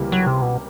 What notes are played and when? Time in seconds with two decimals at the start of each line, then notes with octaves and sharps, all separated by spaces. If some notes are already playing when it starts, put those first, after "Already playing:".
Already playing: C#2 C3 E3 G3 A#3
0.12 F#3
0.27 C3
0.42 B2